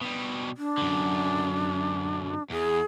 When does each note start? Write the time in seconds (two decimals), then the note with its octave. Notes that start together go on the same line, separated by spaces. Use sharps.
0.01 B2 G3
0.57 D4
0.78 F#2 D3
2.51 E2 G#4